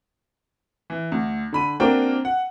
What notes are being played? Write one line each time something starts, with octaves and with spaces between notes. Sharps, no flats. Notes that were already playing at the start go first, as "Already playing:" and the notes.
E3
D2
D3 B5 D#7
A#3 C4 D4 F#4 A#4 G5
F#5